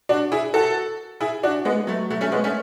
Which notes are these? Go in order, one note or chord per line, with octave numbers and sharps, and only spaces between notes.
D4 F#4
E4 G#4
F#4 A4
E4 G#4
D4 F#4
G#3 B3
F#3 A3
F#3 A3
A3 C#4
G#3 B3
A3 C#4